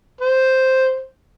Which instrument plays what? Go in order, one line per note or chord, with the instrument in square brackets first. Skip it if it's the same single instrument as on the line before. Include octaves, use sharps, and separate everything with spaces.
[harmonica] C5